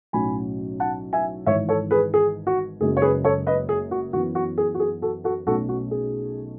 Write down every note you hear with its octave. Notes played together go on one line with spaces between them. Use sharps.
B1 A2 F#3 C#4 G#5 B5
F#5 A5
E5 G#5
G#1 G#2 E3 C#5 E5
A4 C#5
G#4 B4
G#4
F#4
F#1 F#2 C#3 G#3 C#4 G#4
C#5
G#4 B4
A4 C#5
B4 D#5
G#4
F#4
F#2 E3 B3 F#4
F#4
G#4
F#4
G#4
F#4 A4
F#4 A4
B1 B2 A3 C#4 F#4 A4
F#4
G#4